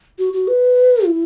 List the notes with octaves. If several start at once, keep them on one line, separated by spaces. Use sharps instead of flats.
F#4
F#4
B4
E4